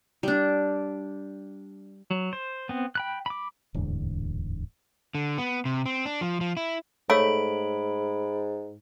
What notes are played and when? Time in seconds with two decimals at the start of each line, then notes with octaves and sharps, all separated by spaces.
0.23 G3 D4
2.10 F#3
2.33 C5
2.69 B3 C4
2.95 G5 B5 F#6
3.26 B5 D6
3.74 D1 E2 G#2 D3
5.15 D3
5.38 B3
5.65 C3
5.86 C4
6.06 D4
6.21 F3
6.41 F3
6.57 E4
7.10 G#2 A3 A4 C#5 F5 B5 D7